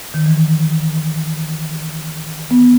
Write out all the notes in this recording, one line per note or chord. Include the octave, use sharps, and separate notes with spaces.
D#3
E3
B3